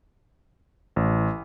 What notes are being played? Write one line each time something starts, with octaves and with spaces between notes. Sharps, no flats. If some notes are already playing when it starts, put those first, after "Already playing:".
A1